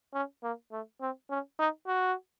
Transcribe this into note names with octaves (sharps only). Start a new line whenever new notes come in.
C#4
A#3
A3
C4
C#4
D#4
F#4